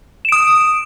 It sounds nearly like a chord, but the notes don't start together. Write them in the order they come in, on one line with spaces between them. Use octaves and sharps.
E7 D7 D#6